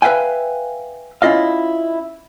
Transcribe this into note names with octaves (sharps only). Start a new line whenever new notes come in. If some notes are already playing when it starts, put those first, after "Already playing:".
B4 E5 F5 G5 G#5
C#4 E4 F4 D#5 F5